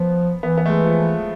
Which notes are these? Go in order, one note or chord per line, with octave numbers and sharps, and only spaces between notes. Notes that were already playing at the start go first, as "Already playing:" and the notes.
Already playing: F3 B3
E3 B3
B3
A3
G#3
F3